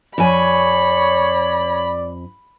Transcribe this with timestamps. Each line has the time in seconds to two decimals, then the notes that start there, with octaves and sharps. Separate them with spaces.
0.18 F2 C#5 D5 G#5 B5